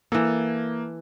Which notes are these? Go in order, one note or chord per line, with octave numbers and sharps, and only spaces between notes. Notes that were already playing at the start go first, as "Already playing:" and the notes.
E3 A#3 A4